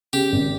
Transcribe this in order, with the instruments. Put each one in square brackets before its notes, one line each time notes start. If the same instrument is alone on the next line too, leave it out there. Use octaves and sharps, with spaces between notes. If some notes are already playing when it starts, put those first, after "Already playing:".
[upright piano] C#3 [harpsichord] G4
[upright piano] G#1